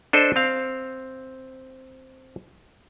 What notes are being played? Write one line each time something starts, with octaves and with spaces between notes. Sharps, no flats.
D4 A4 C5 D#5
C4 F5